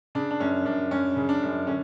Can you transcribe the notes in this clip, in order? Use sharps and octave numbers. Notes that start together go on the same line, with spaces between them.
C#3 D4
D4
F#2 C#4
F#2 D4
F#2 C#4
C#3
D4
F#2
D3 C#4